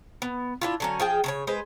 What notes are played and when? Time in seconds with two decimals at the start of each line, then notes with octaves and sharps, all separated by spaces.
0.22 B3
0.61 D4 E4 F4
0.80 D3 F#3 C#4
1.00 F3 G#4 G5
1.24 C#3 A4 C#5
1.47 G#3 B4 C5